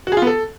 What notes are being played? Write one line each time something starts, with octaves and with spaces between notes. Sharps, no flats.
F#4
G#4
F4
B3
A4